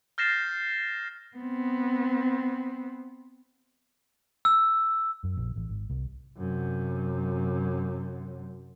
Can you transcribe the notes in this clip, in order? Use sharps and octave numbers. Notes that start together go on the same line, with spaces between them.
F6 G6 A6 A#6 C7 E7
B3 C4
E6
F#2
A#1
A1
G#1
C2
F#2 C3